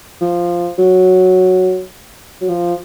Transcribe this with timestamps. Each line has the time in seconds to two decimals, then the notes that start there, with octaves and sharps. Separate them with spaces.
0.21 F3
0.78 F#3
2.41 F#3
2.49 F3